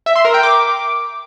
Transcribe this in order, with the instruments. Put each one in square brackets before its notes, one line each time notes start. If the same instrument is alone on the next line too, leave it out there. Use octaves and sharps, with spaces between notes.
[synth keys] E5
C6
A#4
G5
D6